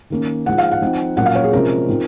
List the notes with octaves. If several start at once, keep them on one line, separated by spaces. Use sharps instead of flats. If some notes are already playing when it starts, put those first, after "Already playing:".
D#3 A#3 C#4
F3 G#3 D#4 F#5
F5
F#5
F3 C4 D#4
A#2 F#3 A#3 C#4 F#5
F5
C#5
G#4
C3 F3 G#3 C#4 A#4
F3 C4 D#4